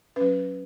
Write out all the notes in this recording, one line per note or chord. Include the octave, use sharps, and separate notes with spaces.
F#3 C#4 B4